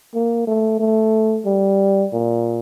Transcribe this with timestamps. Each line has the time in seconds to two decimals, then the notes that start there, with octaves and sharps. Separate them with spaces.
0.15 A#3
0.47 A3
0.80 A3
1.46 G3
2.13 A#2